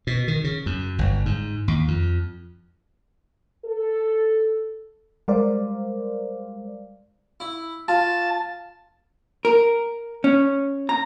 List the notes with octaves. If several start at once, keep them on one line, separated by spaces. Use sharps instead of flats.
B2
D#3
C#3
F#2
G1
G#2
D#2
F2
A4
G3 G#3 A#4 C5 D5 F5
E4
F4 A5
A#4
C#4
A#5